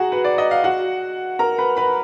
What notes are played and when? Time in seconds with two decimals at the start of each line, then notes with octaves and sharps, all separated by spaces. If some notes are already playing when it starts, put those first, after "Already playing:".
Already playing: F#4 G#4 F#5 A#5
0.12 B4
0.24 D5
0.38 D#5
0.51 F5
0.64 F#4 F#5
1.39 A#4 A#5
1.58 B4 B5
1.77 B4 B5